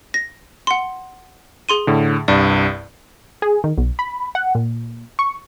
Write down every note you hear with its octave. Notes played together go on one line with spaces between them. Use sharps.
A#6
F#5 C6
G#4 C6 D#7
A2 D3
C2 G2 D5
G#4
D#3
B1
B5
F#5
A#2
C#6